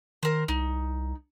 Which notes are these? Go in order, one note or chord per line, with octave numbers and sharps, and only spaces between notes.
D#3 A#4 C5
C2 D#4